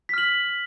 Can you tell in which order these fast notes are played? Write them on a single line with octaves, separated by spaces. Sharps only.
B6 F6 F#7